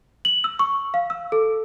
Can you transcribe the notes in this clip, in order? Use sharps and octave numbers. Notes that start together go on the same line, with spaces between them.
F#7
E6
C#6
F5
E6
A4